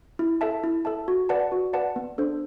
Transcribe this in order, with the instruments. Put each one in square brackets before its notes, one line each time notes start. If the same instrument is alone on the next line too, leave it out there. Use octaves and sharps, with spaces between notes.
[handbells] E4
A4 E5 A5
E4
A4 E5 A5
F#4
B4 D5 F#5 A5
F#4
B4 D5 F#5 A5
B3
D4 A4 C5